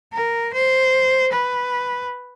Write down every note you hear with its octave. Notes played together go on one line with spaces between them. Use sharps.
A#4
C5
B4